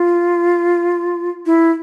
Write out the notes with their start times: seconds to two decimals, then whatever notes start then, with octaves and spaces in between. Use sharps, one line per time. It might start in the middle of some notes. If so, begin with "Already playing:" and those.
Already playing: F4
1.46 E4